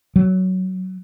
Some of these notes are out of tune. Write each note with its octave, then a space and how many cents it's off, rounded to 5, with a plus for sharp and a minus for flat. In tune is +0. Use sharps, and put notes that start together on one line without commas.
F#3 +10